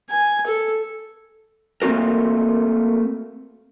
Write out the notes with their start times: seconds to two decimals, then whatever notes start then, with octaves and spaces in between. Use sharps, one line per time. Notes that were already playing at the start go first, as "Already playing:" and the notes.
0.10 G#5
0.47 A4
1.82 A3 A#3 C4 F#4 A#4